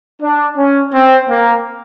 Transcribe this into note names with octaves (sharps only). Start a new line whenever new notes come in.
D4
C#4
C4
A#3